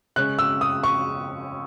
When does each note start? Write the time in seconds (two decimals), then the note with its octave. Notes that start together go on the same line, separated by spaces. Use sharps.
0.16 C#3 G#3 C#4 F#6
0.39 E6
0.61 D#6
0.83 C#6